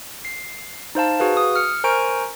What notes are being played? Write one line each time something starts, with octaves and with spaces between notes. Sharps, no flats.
C7
D#4 C5 F5 A5
F#4 G#4 B4 F5
D#6
F6 C#7
A#4 C5 G#5 A#5 C#6 D7